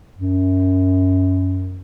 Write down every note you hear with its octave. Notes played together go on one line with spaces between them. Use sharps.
F#2